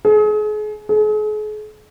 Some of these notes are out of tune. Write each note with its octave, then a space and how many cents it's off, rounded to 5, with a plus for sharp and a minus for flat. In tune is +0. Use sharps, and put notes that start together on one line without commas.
G#4 +35
G#4 +40